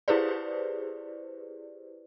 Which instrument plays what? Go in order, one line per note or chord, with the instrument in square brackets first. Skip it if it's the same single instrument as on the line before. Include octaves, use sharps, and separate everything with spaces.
[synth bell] E4 G4 G#4 B4 C5 D5